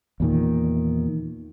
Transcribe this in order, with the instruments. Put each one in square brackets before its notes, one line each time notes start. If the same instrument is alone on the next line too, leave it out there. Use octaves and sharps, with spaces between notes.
[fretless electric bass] E2 A#2 D#3